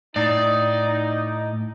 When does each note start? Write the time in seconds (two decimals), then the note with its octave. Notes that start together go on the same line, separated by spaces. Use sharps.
0.16 A2 D#4 D5